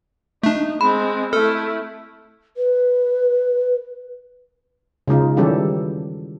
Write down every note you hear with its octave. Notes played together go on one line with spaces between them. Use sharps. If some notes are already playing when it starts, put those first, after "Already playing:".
A3 D4 D#4
G#3 C4 B5
A3 E4 A4 F6
B4
C#3 G#3 D#4 F4
D#3 E3 G3 C#4 G4 A4